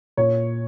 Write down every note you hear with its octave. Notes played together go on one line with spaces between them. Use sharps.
A#2 C#5